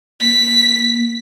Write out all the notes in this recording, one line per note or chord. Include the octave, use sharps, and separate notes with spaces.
A#3 B6